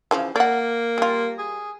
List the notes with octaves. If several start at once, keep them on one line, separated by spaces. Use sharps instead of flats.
C#3 E3 F3
A#3 D5 F#5
G3 F4
G#4